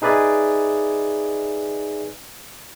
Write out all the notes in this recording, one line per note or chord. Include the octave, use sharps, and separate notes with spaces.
D#4 G#4 B4 D5 E5 G#5